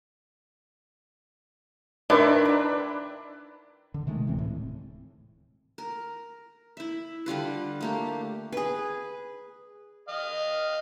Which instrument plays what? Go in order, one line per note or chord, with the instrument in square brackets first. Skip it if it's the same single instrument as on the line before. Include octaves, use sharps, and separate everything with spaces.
[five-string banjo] D#3 [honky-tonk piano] D4 [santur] E4 B4 C6
[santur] A#5 B5
[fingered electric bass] D3
C3 D#3 G#3 A3
D1 E3 C4
A2
[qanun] A#4
E4 E5
D3 G3 F4 B4
A3 A#3 G4
G#4 B4
[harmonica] D#5 F5